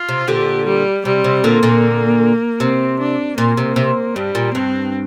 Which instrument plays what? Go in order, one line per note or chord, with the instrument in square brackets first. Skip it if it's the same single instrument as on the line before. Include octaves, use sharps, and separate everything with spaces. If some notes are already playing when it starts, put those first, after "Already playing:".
Already playing: [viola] F4
[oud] C3
[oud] A#2 D3 [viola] G4
[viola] G3
[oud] C3 [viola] G3
[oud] C3
[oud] A#2 D3 [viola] A#3
[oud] A#2 D3
[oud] C3 [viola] C4
[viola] D4
[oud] A#2 [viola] A#3
[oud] C3
C3
[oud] G2 [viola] G3
[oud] A#2
[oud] G2 [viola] C4